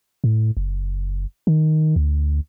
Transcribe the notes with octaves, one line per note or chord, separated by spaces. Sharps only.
A2
F#1
D#3
D2